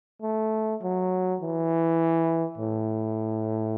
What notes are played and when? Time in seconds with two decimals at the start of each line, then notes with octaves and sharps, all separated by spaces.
0.22 A3
0.82 F#3
1.41 E3
2.58 A2